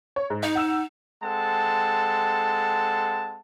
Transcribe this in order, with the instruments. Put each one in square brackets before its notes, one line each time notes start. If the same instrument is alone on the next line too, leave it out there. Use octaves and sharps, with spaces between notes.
[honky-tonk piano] C#5
G#2
[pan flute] D#4 [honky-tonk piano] D#5
[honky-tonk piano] F#5 E6 E7
[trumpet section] G#3 C4 A4 F#5 A5